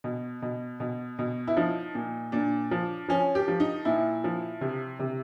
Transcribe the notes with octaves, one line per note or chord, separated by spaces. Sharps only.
B2
B2
B2
B2
E4
F3 D#4
A#2
A#2 D4
F3
F3 C#4
G4
F3
D#4
A#2 E4
F3
C3
C3